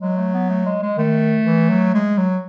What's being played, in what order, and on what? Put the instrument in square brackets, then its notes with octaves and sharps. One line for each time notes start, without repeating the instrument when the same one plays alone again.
[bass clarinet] F#3 [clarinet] G#3
[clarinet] A3
B3
A3
G#3
G#3
[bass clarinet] D#3 [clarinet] A3
[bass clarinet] E3
F#3
G#3
F#3